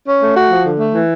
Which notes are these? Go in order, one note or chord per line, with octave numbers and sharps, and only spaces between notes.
C#4
A3
F#4
F3
D3
A3
E3